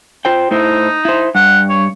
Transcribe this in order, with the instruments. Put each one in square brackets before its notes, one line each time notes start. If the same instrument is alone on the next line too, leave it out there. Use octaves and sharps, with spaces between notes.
[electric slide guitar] F4 C5 G5
[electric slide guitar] A2 E4 C5 [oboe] D#4
[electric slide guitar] E4 C5
[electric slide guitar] G2 [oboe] F#5
[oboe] C#5